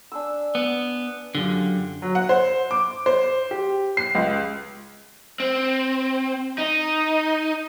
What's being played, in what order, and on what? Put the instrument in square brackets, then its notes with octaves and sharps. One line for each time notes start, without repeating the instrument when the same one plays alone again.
[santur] D4 G#5 E6
[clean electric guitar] B3
[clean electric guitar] F#2 D3 [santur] F4 G4
[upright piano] F#3
F#5
C5
D6
C5
G4
C7
C#2
[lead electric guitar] C4
D#4